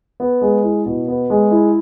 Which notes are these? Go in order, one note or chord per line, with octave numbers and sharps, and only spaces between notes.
B3
G#3
E4
B2
B3
G#3
E4